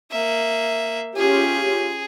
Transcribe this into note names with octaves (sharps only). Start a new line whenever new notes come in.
A#3 E5
C#4 F4 G4 G#4